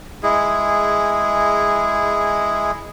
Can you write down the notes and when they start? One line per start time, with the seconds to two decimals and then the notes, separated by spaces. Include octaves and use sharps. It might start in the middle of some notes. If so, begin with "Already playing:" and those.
0.23 G#3 E4 G#4